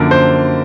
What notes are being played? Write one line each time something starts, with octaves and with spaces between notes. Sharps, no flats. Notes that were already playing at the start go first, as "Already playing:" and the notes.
Already playing: F#2 D3 F3 A#3 A#4
C5